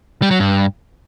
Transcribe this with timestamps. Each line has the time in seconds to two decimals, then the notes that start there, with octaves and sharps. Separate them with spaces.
0.22 G3
0.31 F#3
0.39 G2